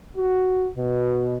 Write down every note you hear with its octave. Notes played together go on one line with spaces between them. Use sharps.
F#4
B2